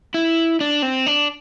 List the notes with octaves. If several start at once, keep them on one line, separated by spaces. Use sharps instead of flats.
E4
D4
C4
D4